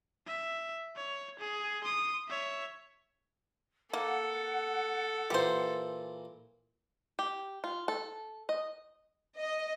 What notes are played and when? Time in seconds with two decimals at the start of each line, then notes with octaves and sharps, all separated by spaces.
0.27 E5
0.96 C#5
1.39 G#4
1.84 C6 D#6
2.28 C#5 E5
3.93 A#3 A4 F#5
5.30 A#2 E3 A#3 G4 C5
7.19 G4
7.64 F4
7.88 A4
8.49 D#5
9.39 D#5